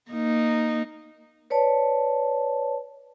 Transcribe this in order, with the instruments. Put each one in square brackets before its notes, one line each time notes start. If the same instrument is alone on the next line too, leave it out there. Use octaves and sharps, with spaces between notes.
[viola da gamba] A#3 D#4
[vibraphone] B4 C#5 D5 A5